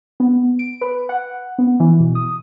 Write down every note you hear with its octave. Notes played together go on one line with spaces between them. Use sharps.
B3
D7
B4
F#5
B3
E3
B2
D#6